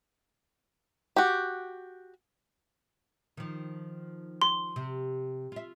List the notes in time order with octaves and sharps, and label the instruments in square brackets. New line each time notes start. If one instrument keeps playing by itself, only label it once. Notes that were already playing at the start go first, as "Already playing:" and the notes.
[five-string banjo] F#4 G4
[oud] D#3 F3
[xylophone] C6
[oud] C3
F4 E5